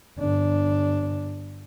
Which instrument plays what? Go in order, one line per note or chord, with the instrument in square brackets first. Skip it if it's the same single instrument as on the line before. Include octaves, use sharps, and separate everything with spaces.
[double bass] G1 D4